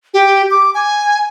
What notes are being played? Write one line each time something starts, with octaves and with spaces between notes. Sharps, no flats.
G4
D6
G#5